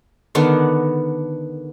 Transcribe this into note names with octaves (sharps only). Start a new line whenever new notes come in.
D3 D#3 B3 D4